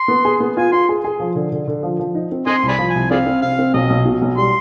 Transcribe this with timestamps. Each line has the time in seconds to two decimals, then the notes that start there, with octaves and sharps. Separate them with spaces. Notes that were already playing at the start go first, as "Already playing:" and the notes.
Already playing: C6
0.08 B3
0.25 G#4
0.40 B3
0.57 F4 G#5
0.72 F4 C6
0.89 G#4
1.04 G#4
1.20 F3
1.35 D3
1.52 D3
1.68 D3
1.83 F3
1.99 F3
2.15 D#4
2.32 C4
2.47 C4 D#5 G#5 C6
2.63 C2
2.68 D5 G#5 B5
2.79 F3
2.90 G#5
2.95 C2
3.11 C4 G#4 D5 F5
3.26 C4
3.42 C3 F5
3.59 C4
3.74 B1 D#5
3.90 B1
4.06 B2
4.22 B1
4.38 G3 C6